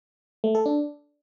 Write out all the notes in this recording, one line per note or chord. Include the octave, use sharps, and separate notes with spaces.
A3
A4
D4